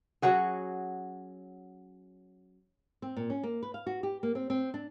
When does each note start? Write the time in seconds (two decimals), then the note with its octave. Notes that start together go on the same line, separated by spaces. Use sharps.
0.22 F#3 C#4 F#4 G#4
3.02 C4
3.17 A#2
3.30 C#4
3.43 A#3
3.63 B4
3.74 F5
3.86 F#4
4.03 G4
4.23 A#3
4.35 C4
4.50 C4
4.74 D4